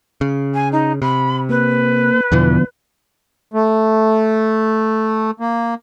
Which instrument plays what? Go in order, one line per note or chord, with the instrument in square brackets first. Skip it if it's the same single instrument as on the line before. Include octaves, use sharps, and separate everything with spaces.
[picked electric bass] C#3
[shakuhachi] G#5
D#4
[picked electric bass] C3 [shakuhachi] B5
[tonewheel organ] A#3 [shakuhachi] B4
[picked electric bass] E2 B2 E3 [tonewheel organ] D3 F3 B3
[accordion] A3
A#3